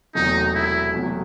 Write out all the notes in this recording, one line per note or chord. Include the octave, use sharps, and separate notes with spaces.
E1 E2 C3 F#3 A3 D#4
E4
E1 E2 C3 F#3 A3